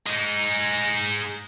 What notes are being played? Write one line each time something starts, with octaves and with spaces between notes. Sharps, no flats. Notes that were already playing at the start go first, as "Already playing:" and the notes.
G#3 D#4